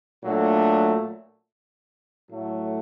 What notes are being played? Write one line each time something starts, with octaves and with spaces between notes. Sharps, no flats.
A#2 F#3 A3 D4
A2 F#3 A3